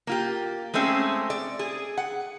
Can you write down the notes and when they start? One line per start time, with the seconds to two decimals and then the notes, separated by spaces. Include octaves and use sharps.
0.07 A#3 F4 G4
0.74 G#3 A3 C4 C#4 G#4
1.30 D5
1.59 G#4
1.97 F#5